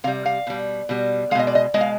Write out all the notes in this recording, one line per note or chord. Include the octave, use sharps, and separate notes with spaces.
C3 G3 F5
F5
B2 G3
B2 G3
B2 G#3 D#5 F5
D5
D#5
B2 G#3 D#5
F5